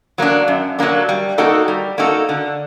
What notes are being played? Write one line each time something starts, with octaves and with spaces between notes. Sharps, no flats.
F#3 A#3 D4
F#2
F#3 A#3 D4
G3
A#3 D#4 F#4 A4
G3
A#3 D#4 F#4 A4
D3